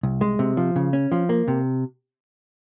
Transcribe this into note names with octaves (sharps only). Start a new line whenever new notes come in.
C2
G#3
C3
F3
C#3
C#4
F3
A#3
C3